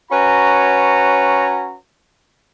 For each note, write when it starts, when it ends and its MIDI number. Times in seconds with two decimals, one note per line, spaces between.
0.11 1.76 61
0.11 1.76 66
0.11 1.76 71
0.11 1.76 73
0.11 1.76 82